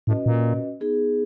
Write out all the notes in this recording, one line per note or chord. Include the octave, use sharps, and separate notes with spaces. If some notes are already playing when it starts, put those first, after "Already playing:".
A2 C#4 F#4 B4 D#5
A#2
B3 D#4 G#4